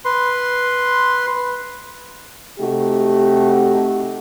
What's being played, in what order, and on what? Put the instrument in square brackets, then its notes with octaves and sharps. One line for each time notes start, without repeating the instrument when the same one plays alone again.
[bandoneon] B4 C6
[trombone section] C3 A3 D#4 F#4 G4